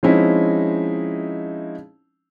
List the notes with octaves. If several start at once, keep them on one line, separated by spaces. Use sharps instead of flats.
F3 G#3 C4 C#4 D#4 E4